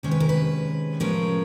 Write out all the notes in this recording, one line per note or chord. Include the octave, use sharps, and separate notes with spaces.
C3 D#3 G#3 C#4 C5
B4
A#4
B4
A2 F3 G#3 C#4 A#4